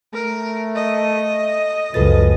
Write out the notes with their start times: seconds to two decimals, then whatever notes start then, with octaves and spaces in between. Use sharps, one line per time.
0.13 A3 A#4
0.75 D#5
1.94 C#2 F#2 F3 A4 B4 A6